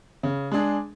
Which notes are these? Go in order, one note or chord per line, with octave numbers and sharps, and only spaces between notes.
C#3
G#3 D4 G#4